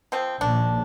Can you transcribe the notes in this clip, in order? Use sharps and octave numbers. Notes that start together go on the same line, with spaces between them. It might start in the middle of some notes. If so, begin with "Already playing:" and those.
F3 C4
A#1 D#2 D4